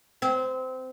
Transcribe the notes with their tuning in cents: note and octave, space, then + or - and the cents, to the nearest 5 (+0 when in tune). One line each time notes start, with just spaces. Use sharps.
C4 -20